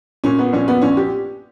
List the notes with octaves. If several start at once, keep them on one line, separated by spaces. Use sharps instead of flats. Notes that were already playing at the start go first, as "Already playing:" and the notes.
A#2 C#4
B3
A#1 C#4
B3
A#1 C#4
G4